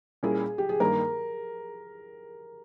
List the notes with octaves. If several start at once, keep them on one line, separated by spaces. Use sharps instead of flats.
A#2 G3 C#4 E4 G#4 A#4
G4
G#4
G2 D#3 G3 A#3 A#4